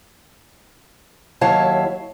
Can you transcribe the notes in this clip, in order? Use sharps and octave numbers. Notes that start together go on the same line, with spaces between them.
D#2 F#3 E4 C#5 F5 A5